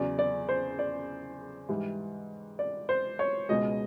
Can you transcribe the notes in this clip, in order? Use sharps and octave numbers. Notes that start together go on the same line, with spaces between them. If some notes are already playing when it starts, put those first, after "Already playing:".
Already playing: E2 C#3 F#3 D5
D5
C5
D5
G#2 E3 G3
D5
C5
C#5
C#2 B2 G#3 D#5